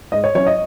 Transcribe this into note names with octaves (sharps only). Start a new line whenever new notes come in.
G#2 D#5
C#5
F#3 C#4 E4 C#5
D#5